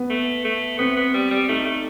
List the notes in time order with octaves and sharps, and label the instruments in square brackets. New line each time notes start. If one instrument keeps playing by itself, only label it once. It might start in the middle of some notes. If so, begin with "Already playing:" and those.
Already playing: [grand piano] B3
[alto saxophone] A3
A3
[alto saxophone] B3 [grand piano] C4
[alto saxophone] B3
G3
G3
[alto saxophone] A3 [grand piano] D#4
[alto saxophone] A3